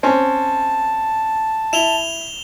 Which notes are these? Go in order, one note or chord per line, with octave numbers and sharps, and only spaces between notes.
C4 C#4 A5
E4 E7 F7 G7